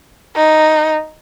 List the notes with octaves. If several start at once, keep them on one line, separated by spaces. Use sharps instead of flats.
D#4